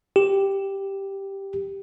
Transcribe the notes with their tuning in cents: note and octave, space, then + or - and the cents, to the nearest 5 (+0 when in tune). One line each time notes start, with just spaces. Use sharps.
G4 +0